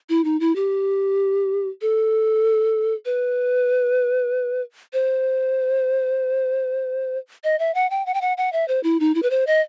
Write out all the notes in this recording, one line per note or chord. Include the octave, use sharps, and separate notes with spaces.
E4
D#4
E4
G4
A4
B4
C5
D#5
E5
F#5
G5
F#5
G5
F#5
F#5
E5
C5
E4
D#4
E4
B4
C5
D#5